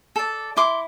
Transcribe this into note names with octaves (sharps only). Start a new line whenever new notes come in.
A4 D5
E4 C6 D6